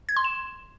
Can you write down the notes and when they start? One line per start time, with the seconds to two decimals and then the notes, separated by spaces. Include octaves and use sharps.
0.09 G#6
0.17 C6
0.24 E7